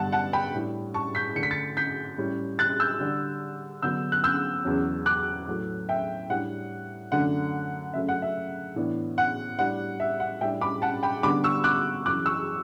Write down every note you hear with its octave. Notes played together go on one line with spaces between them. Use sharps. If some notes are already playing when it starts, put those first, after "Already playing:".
Already playing: G2 D3 G3 B3 F#5 A5
F#5 A5
G5 B5
A2 G3 D4
A5 C#6
G6 B6
D3 A3 D4 C#7
B6
A6 C#7
G6 B6
A2 G3 C#4
F#6 A6
E6 G6
D3 G3 D4
D3 F#3 B3 D4 E6 G6
F#6
E6 G6
E2 C#3 F#3 C#4
D6 F#6
A2 F#3 A3
E5 G5
A2 G3 D4 F#5
F#2 D3 A3 D4 F#5
C#3 F#3 A3 C#4 E5
F#5
E5
A2 E3 B3 D4
F#5
A2 G3 D4 F#5
E5
F#5
A2 G3 D4 E5 G5
B5 D6
F#5 A5
G5 B5
D3 G3 B3 D4 B5 D6
C#6 E6
D6 F#6
F#2 C#3 E3 D6 F#6
C#6 E6